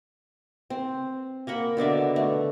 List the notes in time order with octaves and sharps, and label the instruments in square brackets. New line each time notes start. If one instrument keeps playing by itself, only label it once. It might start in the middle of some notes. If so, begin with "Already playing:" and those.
[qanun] C4
A#3 A#4 F#5 B5
B2 D3 D5 E5
A3